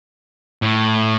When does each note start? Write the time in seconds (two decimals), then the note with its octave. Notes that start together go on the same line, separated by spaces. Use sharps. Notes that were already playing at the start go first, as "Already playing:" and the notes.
0.62 A2